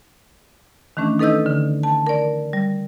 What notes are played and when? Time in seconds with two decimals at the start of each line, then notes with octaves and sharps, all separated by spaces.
0.97 D#3 E3 A3 C#4 D4
1.19 D#4 A4 B4 D#5 E6 G6
1.46 D3
1.83 A5
2.07 A#4 D5
2.53 G3